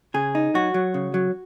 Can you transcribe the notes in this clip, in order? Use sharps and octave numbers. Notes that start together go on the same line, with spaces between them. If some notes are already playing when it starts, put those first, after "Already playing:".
C#3 G#4
D#4
F#3 F#4
F#3
C#3
F#3